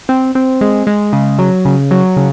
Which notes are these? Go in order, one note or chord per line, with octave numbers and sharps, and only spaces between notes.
C4
C4
G#3
G#3
C#3
F#3
C#3
F#3
C#3